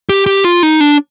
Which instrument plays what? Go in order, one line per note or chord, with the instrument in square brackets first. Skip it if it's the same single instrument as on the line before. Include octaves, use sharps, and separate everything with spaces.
[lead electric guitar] G4
G4
F4
D#4
D4